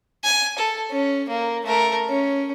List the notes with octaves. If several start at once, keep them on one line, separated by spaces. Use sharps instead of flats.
G#5
A4
C#4
A#3
A3 A#4
C#4